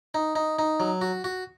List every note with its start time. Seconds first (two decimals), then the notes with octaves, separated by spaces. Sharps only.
0.14 D#4
0.36 D#4
0.59 D#4
0.80 F#3
1.01 F#4
1.24 F#4